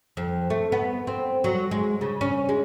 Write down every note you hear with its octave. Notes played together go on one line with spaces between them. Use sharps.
F2
A3
B3
C4
F#3
G#3
C#3
C#4
G#3